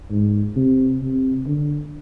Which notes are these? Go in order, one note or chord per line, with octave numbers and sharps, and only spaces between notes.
G#2
C3
C3
D3